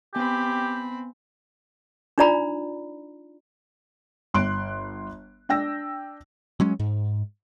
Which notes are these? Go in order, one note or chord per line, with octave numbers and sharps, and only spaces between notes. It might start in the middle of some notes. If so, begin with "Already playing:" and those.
B3 C4 G4 G#5 B5
D4 D#4 F4 D5 A#5 B5
G1 C6 F#6 D7
D4 G5 E6 A#6
F#3 G#3 C#4
G#2